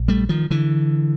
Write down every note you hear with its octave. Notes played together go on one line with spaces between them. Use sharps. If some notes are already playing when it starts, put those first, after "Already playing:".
Already playing: A#1
G3 A3
D#3 F3
D3 E3